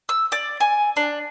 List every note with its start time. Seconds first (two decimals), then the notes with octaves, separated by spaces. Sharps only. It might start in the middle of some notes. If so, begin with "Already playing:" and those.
0.09 E6
0.32 D5
0.60 G#5
0.96 D4